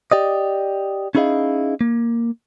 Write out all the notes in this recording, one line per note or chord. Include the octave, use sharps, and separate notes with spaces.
G4 D5 D#5
C#4 D#4 E4 G#4 D#5 F5
A#3